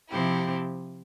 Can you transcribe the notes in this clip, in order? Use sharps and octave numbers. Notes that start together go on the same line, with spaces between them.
C3 F3 C4 E4 G4